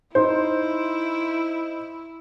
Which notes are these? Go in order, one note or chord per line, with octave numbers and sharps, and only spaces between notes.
D#4 E4 C5